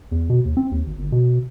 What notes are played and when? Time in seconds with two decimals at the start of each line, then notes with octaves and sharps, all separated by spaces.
0.11 E2
0.30 B2
0.45 D#2
0.57 C4
0.71 D#2
0.87 G#1
0.99 G1
1.12 B2